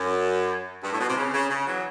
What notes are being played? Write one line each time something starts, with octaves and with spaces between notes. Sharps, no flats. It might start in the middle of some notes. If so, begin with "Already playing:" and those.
Already playing: F#2
G2
A2
B2
C3
C#3
C#3
C#3
E3 F#3